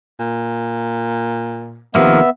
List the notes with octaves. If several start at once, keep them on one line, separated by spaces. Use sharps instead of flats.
A#2
C3 D#3 F3 A#3 B3 E5